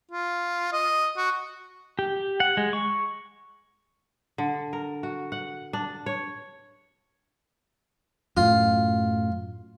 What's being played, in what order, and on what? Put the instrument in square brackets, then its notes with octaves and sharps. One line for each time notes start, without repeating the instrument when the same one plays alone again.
[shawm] F4
D#5
F#4
[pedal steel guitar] G4
F#5
G#3
C#6
[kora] D3
A#4
F#4
F#5
D4
C#5
[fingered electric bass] F#2 A2 [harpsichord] F4